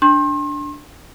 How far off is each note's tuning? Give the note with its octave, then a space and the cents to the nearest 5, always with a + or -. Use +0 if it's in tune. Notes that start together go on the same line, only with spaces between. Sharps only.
D4 +0 C6 +40